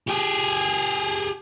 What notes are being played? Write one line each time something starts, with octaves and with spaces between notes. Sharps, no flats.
G4 G#4